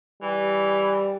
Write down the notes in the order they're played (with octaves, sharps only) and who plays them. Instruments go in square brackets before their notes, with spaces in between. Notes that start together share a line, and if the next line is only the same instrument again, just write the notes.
[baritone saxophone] E3 [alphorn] G3